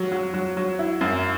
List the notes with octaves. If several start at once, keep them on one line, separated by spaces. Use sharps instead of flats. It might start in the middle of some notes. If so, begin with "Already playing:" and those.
Already playing: F#3
F#3
F#3
F#3
E4
F#2